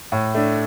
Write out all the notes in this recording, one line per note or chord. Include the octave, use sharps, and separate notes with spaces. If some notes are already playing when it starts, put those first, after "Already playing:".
A2
A3 D4